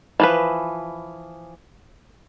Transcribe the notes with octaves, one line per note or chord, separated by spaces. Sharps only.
E3 F3 B4